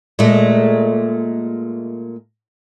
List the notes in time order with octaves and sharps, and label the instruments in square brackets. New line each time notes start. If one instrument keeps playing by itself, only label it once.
[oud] A#2 G#3 A3